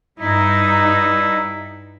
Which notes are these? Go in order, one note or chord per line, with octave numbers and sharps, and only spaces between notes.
G2 D#4 E4